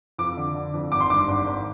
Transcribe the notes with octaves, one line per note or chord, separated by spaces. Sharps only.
F2 D6
D3
D3
F2
G#1 D6
C6
G2 D6
G#1
G#1